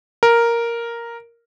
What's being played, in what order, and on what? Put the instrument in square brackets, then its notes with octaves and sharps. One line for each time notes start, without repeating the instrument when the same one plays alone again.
[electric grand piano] A#4